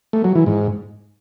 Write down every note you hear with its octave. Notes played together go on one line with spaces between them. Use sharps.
A3
F#3
E3
G#2